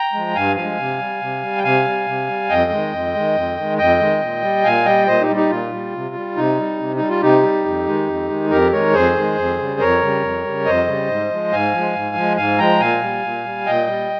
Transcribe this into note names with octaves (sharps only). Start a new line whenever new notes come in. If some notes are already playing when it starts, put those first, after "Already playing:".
Already playing: G5 A#5
F3 G#3
G2 F5 G#5
F3 G#3 F5 G#5
C3
G3
C3
G3
G5
C3 F5 G#5
G3
C3
G3
F2 D#5 G5
D#3 G#3
F2
D#3 G#3
F2
D#3 G#3
F2 D#5 G5
D#3 G#3
A#2
G3
A#2 F5 G#5
G3 D#5 G5
A#2 C5 D#5
D#4 G4
G3
D#4 G4
A#2 F4
G3
C3
G3
C3 D#4
G3
C3
G3 D#4
F4
C3 D#4 G4
G3
F2
D#3 G#3
F2
D#3 G#3
F2 G4 A#4
D#3 G#3 A#4 C#5
F2 G#4 C5
D#3 G#3
F2
C#3 G3
F2 A#4 C#5
C#3 G3
F2
C#3 G3
F2 C5 D#5
C#3 G3
G#2
F3 G#3
G#2 F5 G#5
F3 G#3
G#2
F3 G#3
G#2 F5 G#5
F3 G#3 G5 A#5
A#2 F5 G#5
G3
A#2
G3
A#2 D#5 G5
G3